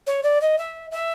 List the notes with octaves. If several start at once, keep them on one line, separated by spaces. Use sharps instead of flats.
C#5
D5
D#5
E5
E5